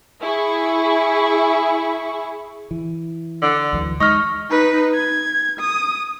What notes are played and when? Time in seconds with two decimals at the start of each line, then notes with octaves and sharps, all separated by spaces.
0.21 E4 G#4 C#6
2.71 E3
3.42 D3
3.73 D2 E3 F#3
4.00 G#3 D#4 C#6 F6
4.50 D#4 B4
4.95 G#6
5.60 D#6